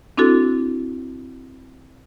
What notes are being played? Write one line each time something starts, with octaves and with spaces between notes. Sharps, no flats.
C4 D4 E4 F#4 A4